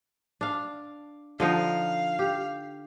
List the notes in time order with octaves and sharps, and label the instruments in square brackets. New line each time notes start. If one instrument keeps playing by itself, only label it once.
[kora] D4 F5
[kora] D3 F3 D#4 [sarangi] F5
[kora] G4